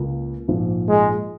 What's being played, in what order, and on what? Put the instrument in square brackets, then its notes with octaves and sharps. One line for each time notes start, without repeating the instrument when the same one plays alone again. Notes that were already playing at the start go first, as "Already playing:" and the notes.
Already playing: [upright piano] C#2 C#3 A#3
A#1 G#2 F3
[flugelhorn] G#3